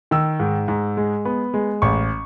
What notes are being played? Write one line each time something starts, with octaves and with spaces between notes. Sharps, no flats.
D#3 E6
G#2
G#2
G#3
B3
G#3
A1 C#6